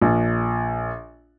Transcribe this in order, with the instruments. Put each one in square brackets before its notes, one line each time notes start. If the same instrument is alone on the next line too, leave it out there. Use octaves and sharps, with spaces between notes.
[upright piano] A#1